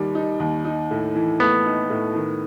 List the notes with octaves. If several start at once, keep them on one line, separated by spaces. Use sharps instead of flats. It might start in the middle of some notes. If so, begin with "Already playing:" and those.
Already playing: D#2 D#3 G3
D#4
D#2
D#4
A2
E3
A3 B3
D#4
A2
D#3